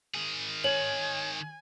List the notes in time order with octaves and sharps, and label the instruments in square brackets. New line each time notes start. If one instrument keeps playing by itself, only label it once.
[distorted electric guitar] D#3 G#4
[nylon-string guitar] C#5 [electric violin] G#5 [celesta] F#7